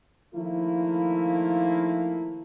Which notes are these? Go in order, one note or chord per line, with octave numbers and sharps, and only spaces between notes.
D#3 F3 A3 A#3 E4